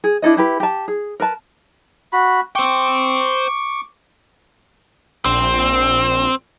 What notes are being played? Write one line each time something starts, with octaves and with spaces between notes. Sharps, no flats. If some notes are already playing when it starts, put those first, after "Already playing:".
G#4
D4 E4 A4 D#5
E4 G4 B4
G4 A5
G#4
A#4 B4 A5
F#4 B5
C5 G5 C#6 D6
A#1 C4